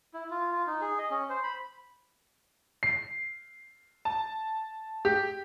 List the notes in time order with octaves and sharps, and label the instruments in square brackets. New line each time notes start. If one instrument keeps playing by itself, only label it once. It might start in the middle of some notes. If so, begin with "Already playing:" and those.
[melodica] E4
F4
F4
D#4
G#4
D#5
C#4
C5
B5
[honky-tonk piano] C7
A5
G4